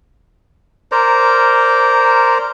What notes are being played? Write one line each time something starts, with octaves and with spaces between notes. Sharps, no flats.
A#4 C5 D5 A#5